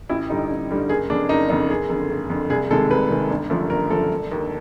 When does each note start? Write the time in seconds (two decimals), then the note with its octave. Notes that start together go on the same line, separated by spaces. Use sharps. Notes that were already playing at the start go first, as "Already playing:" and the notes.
0.09 A1 E4
0.30 G2 D3 G3 D#4
0.50 A1
0.70 G2 D3 G3
0.89 F#1 G#4
1.10 F2 C#3 D4
1.29 F#1 D#4
1.49 F2 C#3 D#4
1.69 F#1 G#4
1.90 F2 D3
2.10 F#1
2.30 F2 D3
2.50 C2 G#4
2.70 C3 D#3 G#3 A4
2.90 C2 B4
3.10 C3 D#3 G#3
3.30 G1
3.50 F#2 D3 F3 A3
3.70 G1 A#4
3.90 F#2 D3 F3 A3 A4
4.10 E1
4.30 D#2 D3